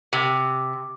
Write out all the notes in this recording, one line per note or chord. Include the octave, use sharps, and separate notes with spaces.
C3